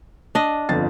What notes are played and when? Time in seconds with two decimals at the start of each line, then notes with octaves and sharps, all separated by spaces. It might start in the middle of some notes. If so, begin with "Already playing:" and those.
0.35 D4 D#5
0.69 G1 F2 A6